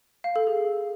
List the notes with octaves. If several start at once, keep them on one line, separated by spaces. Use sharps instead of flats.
F5
A4
G#4